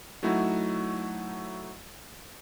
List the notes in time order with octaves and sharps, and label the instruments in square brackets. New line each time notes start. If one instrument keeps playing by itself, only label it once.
[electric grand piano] F#3 A3 D#4 E4 F#4